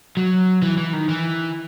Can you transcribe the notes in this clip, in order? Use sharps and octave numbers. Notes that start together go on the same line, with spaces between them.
F#3
E3
E3
D#3
E3